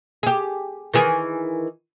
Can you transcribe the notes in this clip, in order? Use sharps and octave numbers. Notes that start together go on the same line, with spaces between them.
G4 G#4
D#3 E3 G#4